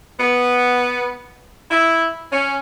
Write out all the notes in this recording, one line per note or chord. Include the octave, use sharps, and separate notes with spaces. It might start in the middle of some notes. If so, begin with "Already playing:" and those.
B3
E4
C#4